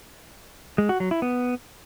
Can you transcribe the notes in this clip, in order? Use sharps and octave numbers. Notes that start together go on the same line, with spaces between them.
G#3
F#4
F#3
E4
B3